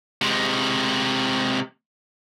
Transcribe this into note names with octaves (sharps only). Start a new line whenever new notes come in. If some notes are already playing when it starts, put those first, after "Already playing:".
C3 G#3